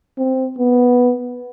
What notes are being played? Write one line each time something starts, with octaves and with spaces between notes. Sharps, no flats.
C4
B3